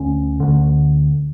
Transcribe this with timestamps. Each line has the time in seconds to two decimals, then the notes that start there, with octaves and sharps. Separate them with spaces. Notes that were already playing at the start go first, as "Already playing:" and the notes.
Already playing: D2 D3 C#4
0.40 D2 D3